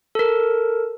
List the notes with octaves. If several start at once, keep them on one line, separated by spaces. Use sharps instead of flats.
A4 A#4